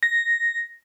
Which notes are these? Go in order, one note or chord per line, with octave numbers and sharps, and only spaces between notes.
A#6